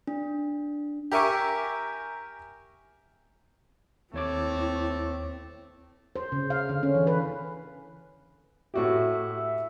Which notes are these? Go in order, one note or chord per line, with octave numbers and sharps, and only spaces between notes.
D4
G4 A#4 E5 G#5 C#6 D6
D#2 A3 C4 E4 C#5 D6
C5
C#3
F5
D3
C#4
E3
B4
A2 F#4 G4 E5